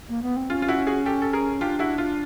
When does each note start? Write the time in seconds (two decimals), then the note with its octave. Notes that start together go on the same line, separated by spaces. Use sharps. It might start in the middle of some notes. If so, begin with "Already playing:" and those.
0.09 A#3
0.22 B3
0.36 C4
0.50 C#4 F4
0.62 F4
0.68 E4 F#4
0.87 F#4 G#4
1.06 G4 A4
1.22 A4
1.33 G#4 A#4
1.61 D4 F4 G4
1.79 E4 F#4
1.98 F4